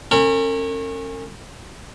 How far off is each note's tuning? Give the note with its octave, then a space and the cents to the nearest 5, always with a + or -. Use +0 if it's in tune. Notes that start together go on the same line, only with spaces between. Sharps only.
C#4 -30 A#4 -45 B5 +0